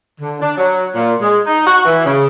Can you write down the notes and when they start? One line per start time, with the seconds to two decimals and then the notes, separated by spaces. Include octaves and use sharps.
0.19 D3
0.41 D4
0.58 F#3
0.95 A#2
1.21 G#3
1.46 D#4
1.65 F#4
1.85 E3
2.05 C#3